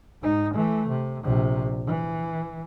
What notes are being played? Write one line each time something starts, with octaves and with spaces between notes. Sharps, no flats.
G#2 D#4
E3 A3
C3
A#1 C3
E3